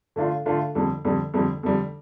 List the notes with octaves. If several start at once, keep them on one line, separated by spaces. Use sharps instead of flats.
D3 A3 D4 F4
D3 A3 D4 F4
F2 D3 G3
F2 D3 G3
F2 D3 G3
F2 D3 G3